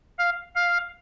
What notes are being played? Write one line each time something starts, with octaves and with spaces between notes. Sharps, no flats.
F5
F5